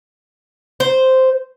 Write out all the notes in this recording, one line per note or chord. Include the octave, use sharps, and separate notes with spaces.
C5